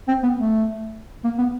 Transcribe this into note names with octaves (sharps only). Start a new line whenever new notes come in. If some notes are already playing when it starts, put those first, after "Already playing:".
C4
B3
A3
A#3
B3